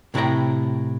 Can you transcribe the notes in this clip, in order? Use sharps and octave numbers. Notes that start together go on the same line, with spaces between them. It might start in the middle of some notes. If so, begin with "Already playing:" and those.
A2 C3 E4 D5 G5 A#5